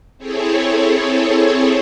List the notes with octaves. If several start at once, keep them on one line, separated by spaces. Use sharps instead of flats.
C4 E4 G#4 A4 C#5